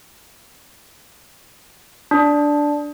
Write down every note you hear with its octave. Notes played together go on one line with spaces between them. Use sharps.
D4